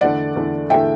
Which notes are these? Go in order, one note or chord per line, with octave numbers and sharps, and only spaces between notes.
E2 D3 A3 D5 F#5
E2 D3 A3
E2 D3 A3 E5 G5